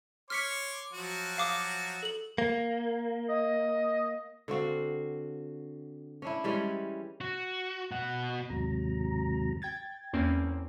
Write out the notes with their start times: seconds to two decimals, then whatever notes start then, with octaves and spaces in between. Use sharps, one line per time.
0.30 C#5 C6 D6 F6 B6 C#7
0.93 F3 F#3 F#4
1.38 F5 D6 D#6
2.03 A4 F#7
2.38 A#3
3.29 D#5
4.48 D3 C4 F#4 F5
6.22 C#4 D4 E4
6.44 E3 G3 G#3 C#4
7.21 F#4
7.92 B2 F#5
8.50 D#2 G#2 C3 F#3 A#5
9.62 G5 G#6 A6
10.13 E2 A#3 C4 C#4